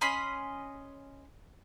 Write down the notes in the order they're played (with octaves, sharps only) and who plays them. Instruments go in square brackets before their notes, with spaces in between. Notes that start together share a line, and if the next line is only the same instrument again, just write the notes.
[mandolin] C#4 D#5 B5 C6